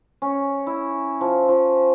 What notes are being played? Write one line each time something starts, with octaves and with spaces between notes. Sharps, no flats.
C#4
E4
F3
F3